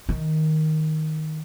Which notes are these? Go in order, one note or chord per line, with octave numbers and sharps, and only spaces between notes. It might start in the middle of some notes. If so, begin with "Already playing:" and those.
D#3